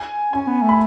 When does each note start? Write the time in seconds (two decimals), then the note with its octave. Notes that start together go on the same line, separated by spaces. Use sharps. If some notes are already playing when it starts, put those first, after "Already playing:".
Already playing: G#5
0.33 C#4 G#5
0.47 B3
0.62 A3
0.69 B5